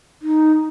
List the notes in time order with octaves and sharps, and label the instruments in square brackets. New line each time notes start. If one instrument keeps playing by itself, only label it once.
[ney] D#4